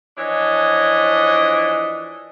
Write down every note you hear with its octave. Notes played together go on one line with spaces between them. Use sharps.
E3 F3 D4 C#5 D#5